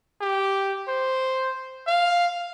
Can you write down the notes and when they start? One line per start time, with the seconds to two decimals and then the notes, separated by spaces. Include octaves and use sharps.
0.21 G4
0.88 C5
1.87 F5